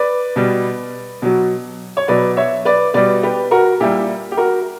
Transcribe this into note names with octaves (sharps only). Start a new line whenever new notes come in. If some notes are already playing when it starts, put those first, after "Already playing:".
Already playing: B4 D5
B2 G3
B2 F#3
C#5
B2 F#3 B4 D5
C#5 E5
B4 D5
B2 G3 B4 D5
G4 B4
F#4 A#4
A#2 G3 E4 G4
G4
F#4 A#4